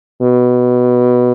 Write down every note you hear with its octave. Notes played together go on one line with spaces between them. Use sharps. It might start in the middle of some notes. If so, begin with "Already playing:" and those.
B2